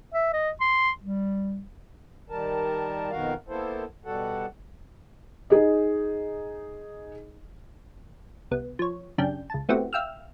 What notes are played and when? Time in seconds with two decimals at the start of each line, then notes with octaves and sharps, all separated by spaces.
0.14 E5
0.33 D#5
0.61 C6
1.03 G3
2.30 D#3 G3 A#4 A5
3.11 F2 B2 D#3 F#4 A#4 F5
3.49 A#3 B3 E4 A4 C5
4.05 B2 G3 F#4 A4 F#5
5.50 D#4 G#4 D#5
8.51 C2 B3
8.79 F3 C#5
9.18 F#2 C#3 D4 G4 G6
9.50 C#2 A5
9.69 A3 B3 C4 E4 F#4 G4
9.93 E5 F5 G5 E6 F6